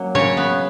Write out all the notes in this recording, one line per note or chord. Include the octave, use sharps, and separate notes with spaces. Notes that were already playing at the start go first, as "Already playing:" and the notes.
Already playing: F#3 A#3 C#4
C#3 C#5
B3